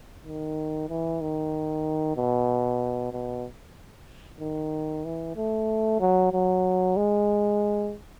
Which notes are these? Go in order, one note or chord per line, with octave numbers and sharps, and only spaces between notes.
D#3
E3
D#3
B2
B2
D#3
E3
A3
F#3
F#3
G#3